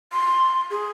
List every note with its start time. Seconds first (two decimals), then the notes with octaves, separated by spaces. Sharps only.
0.13 C6
0.70 G#4